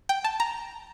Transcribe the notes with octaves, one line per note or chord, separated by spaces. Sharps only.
G5
A5
A#5